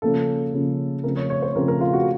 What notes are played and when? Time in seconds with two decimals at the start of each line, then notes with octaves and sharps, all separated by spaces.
0.02 C#3 F3 A#3 C#4 A4
0.54 C#3 F3 A#3 C#4
1.04 C#3 F3 A3 C4 A#4
1.17 C#5
1.30 C#5
1.42 C5
1.55 C#3 F3 A3 C4 A#4
1.68 A#4
1.81 F4
1.93 F#4